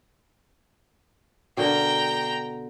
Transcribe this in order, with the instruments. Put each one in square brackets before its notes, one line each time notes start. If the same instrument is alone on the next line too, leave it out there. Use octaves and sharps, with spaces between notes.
[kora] B2 D3 A#4 [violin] G5 A#5